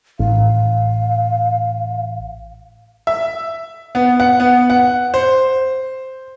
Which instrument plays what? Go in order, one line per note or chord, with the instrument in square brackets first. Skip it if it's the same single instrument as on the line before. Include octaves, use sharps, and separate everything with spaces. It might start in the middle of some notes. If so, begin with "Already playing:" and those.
[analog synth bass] A1 [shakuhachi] F5
[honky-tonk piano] E5
[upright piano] B3
F#5
B3
F#5
C5